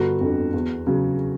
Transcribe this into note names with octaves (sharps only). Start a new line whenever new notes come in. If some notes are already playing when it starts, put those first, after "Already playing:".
Already playing: G1 F#4
F2 D3
E2
C#3 F#3